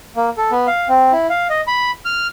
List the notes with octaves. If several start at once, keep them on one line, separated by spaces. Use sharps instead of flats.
A#3
A4
B3
F5
C4
E4
F5
D#5
B5
F6